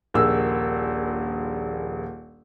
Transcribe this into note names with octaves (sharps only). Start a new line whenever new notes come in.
D#1 A#1 A#3 G#4 E6